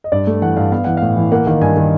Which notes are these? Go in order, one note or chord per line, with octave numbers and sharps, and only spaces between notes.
D#5
G2 D5
A3
E3 F#5
G2 F5
B3 F5
E3 F#5
A2 F5
E3
A#3 F#5
D#3 F5
G2 G#5
D#3